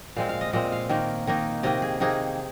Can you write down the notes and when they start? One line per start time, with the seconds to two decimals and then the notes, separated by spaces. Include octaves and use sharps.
0.16 A#2 G#3 C4 F5
0.29 F5
0.41 D#5
0.53 A#2 G#3 C4 D#5
0.72 F5
0.89 D#3 A#3 D#4
1.27 D#3 A#3 D#4
1.63 C3 D#3 A#3 D#4 D#5
1.82 G#4
2.00 C3 D#3 A#3 D#4 G#4